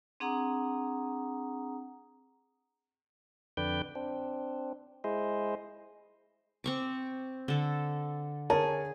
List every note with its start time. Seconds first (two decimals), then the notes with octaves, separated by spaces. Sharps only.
0.20 C4 D4 G#4 F#5 A#5 D#6
3.57 F2 D3 B4 D5 G5 G6
3.95 C4 D4
5.04 G#3 E4 G#4 C5 D#5
6.64 C4 C#6 D6
7.48 D3 A4
8.50 G#4 A#4 C#5 A5